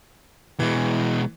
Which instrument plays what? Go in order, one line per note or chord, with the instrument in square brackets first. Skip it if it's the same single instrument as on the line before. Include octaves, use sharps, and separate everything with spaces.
[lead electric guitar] B2 G#3 [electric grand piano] E3